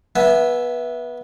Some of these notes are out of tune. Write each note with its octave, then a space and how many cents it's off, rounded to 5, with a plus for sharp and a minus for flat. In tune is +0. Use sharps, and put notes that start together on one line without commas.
B3 -20 E5 +0 G#5 +0